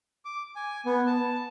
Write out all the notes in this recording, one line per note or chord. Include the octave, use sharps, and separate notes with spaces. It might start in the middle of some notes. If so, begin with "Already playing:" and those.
D6
G#5
B3
A5